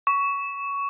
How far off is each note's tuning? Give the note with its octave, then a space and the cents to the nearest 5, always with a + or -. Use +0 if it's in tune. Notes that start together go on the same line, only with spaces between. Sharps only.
C#6 +15